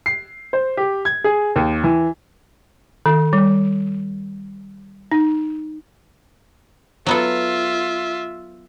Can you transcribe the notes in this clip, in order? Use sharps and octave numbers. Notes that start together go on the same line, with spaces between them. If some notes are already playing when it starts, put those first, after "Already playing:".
C7
C5
G4
G#6
G#4
D#2
E3
D#3
G3
D#4
F#3 B3 F4 A4 E5